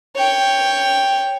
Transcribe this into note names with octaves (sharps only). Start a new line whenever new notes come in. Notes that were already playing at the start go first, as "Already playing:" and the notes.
C#5 G5